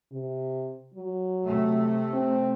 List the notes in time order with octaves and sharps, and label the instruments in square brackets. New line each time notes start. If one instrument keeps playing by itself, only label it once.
[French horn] C3
F#3
[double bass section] C3 A3
[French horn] C4